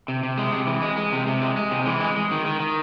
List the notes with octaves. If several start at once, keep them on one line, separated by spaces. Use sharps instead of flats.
C3
C3
G#3
C3
E3
G#3
G#3
C3
C3
G#3
G#3
C3
E3
G#3
G#3
D#3
D#3
D#3